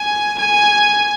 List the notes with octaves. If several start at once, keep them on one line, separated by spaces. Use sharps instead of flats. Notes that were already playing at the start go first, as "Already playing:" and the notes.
Already playing: G#5
G#5